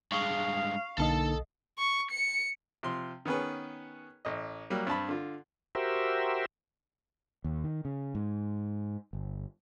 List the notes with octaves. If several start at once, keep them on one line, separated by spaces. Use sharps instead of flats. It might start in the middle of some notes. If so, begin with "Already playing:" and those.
G2 G#3 F5 C#6
B1 D3 A#3 D#4 A4 D#5 A5
C#6
C#7
C3 F3 C6
D#3 B3 C#4 G#4 B4
A1 D#5
F#3 G3 A#3
G2 C4 A5 B5
D3 F4
F#4 G4 A#4 C5 E5
D#2
D#3
C#3
G#2
G1